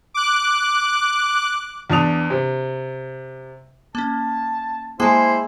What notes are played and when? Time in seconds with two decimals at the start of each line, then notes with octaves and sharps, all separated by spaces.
0.14 D6 F#6
1.90 E2 D4 A5 D#6 F7
2.30 C3
3.95 A#3 C#4 A5
5.00 G#3 A#3 E4 G#4 C5 G5 A5